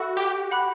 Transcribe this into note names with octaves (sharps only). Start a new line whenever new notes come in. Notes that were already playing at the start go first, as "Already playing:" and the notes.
Already playing: F#4 A4 E5 B5 E6
G4
F#5 B5 F#6